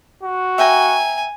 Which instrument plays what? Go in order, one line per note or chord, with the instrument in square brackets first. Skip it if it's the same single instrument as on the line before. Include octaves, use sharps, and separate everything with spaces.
[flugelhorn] F#4
[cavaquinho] E5 G5 A#5 [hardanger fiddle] G#5